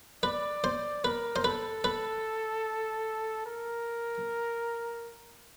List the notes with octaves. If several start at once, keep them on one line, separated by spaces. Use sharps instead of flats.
B4 D5
C5
A#4 B4
C5
A4 B4
B4
A#4